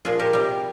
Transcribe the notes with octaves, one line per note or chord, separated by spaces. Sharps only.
A#2 F3 G#3 F4 G#4
G4 A#4
C3 G3